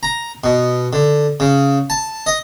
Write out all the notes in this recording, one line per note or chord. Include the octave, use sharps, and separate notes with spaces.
A#5
B2
D3
C#3
A5
D#5